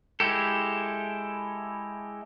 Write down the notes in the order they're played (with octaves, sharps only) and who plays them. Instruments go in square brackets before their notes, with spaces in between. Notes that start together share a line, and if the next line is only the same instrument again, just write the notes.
[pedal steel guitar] G#3 E4 G4 A4